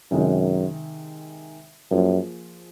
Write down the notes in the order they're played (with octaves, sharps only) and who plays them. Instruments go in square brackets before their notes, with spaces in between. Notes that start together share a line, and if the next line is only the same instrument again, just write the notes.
[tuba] F#2 [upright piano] C3 D#3 G#3 D#4
[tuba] F#2 [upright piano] F3 A#3 F4 G#4 C5